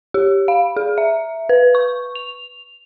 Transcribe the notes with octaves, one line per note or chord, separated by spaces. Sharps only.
G4
F5
G#4
E5
B4
C#6
F7